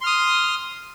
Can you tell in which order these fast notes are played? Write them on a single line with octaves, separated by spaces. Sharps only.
C6 F6 D#6